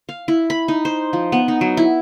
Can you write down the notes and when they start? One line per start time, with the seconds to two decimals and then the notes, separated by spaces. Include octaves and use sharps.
0.09 F5
0.28 E4
0.50 B5
0.68 D#4
0.85 C5
1.13 F3
1.32 B3
1.48 D#4
1.61 F#3
1.77 E4